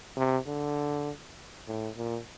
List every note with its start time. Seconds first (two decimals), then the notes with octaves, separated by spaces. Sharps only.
0.17 C3
0.47 D3
1.67 A2
1.97 A#2